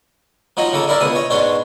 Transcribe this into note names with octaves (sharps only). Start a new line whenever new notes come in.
F3 F#3 D#4 D#5
C#3 A#3 A4
D4 E4 A#4 D5 E5
C#2 B2 G#4 D#6
C#5 D#5
G#2 B2 D4 C5 C#5